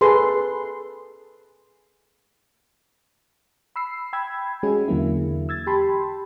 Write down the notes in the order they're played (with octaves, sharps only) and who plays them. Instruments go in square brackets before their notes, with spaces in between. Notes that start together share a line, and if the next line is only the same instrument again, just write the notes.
[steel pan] G#4 A4 B4 C6
[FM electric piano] B5 E6 C7
G5 B5 E6 G#6
G#3 C#4 F#4 G#4
E2 D3 F#3 A#3 E4
E6 G#6 A6
G4 G5 A5 B5 C6